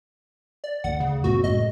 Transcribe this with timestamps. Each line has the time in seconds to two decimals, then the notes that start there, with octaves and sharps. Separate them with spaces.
0.64 D5
0.84 D2 F#5
1.00 C#3
1.24 F#2 A#2 C4 F#4
1.44 A2 G#3 D#5